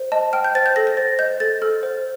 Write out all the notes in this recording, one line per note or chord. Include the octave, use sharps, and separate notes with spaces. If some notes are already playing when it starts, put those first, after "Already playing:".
Already playing: C5
D#5 A5
G5 F6
G6
C5 A6
G6
A4 A#6
A#6
C5 A6
D#5 G6
A4 A6
A4 F6
C5